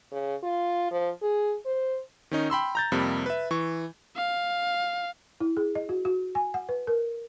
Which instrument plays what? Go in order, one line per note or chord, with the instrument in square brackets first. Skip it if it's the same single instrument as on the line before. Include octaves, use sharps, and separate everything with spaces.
[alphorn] C#3
F4
F3
G#4
C5
[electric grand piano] D#3 C#4 D#4
G5 B5 C6 E6
A#5 G6 A6
F2 C3 G3 A#3 B5
B4 E5
E3 C#6
[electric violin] F5
[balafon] E4
G#4
D#5
F#4
F#4
G#5
F#5
B4
A#4